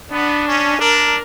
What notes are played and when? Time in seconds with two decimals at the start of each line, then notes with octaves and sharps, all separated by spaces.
0.12 B3 D4
0.47 C#4
0.81 D4 A#4